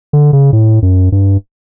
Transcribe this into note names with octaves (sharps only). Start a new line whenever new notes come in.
D3
C#3
A2
F#2
G2